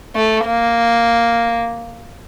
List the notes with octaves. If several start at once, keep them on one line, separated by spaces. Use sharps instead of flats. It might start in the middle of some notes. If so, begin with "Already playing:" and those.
A3
A#3